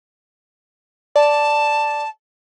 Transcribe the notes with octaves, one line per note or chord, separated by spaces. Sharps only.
D5 A5